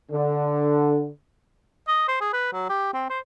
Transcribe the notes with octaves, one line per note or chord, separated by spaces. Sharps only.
D3
D#5
C5
G#4
B4
F#3
G4
C4
C5